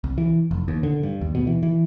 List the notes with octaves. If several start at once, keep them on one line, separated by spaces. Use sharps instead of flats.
C2
E3
F1
D#2
D3
G2
D#2
B2
E3
E3